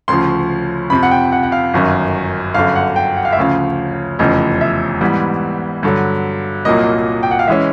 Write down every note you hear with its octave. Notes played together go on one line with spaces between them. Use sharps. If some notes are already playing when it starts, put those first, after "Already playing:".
D2 C#3 F3 C6
F2 C3 F3 B5
F#5
G5
F#5
F#5
F5
G1 F#2 D#3
G1 F#2 D3 F5
F#5
G5
F#5
F5
E5
D2 C#3 F3 F5
F1 E2 C#3 F3 D#5
E5
G#2 E3 G3 B3
G2 D3 F#3
C2 A#2 F#3 A#3 D#5
G5
F#5
F5
E3 G#3 C#4 E5